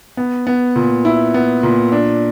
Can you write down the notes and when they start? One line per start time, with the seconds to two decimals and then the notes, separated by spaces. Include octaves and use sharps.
0.17 B3
0.47 B3
0.76 A#2
1.05 E4
1.34 B3
1.63 A#2
1.92 D4